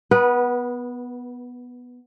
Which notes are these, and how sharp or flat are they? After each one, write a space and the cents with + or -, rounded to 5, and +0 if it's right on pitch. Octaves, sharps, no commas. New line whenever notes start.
B3 +0 B4 -25